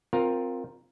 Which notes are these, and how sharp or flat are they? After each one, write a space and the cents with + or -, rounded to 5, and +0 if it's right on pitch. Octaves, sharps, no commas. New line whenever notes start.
C4 +0 F4 +15 A#4 +0